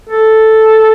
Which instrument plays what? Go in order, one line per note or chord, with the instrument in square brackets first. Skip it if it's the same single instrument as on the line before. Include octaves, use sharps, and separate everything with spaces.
[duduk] A4